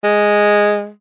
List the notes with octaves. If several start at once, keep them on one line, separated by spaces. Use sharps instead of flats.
G#3